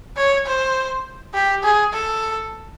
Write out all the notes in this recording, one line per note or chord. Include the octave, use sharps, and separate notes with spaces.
C#5
C5
G4
G#4
A4